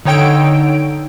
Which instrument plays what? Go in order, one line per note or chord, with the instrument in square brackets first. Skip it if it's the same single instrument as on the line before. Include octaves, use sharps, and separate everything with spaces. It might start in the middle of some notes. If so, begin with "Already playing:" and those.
[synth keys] D3 D#4 C#5 G5 E6 D7